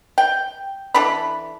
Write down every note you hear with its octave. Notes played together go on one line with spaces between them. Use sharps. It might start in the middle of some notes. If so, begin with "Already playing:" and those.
G5
E3 D4 A4 B5